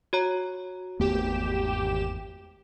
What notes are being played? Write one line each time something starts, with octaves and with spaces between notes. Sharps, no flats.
F#4 C#5 A#5
G#1 E2 A3 B3 G4 E7